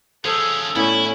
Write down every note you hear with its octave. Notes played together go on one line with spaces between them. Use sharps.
F3 C#4 G#4 A4 C5
A2 B3 C#4 E4 D5